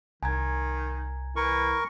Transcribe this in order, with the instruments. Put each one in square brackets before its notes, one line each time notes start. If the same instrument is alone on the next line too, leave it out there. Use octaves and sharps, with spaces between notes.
[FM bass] C2 [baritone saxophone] D#3 [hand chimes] G#5 A#5 G#6
[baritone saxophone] E3 [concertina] A#4 C#6